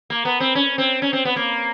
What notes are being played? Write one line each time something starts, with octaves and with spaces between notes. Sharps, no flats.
A#3
B3
C4
C#4
C4
C#4
C4
B3
A#3